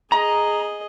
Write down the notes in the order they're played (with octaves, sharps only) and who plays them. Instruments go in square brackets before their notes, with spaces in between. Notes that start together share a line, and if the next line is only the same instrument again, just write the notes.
[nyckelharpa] G#4 D#5 [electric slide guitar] A#5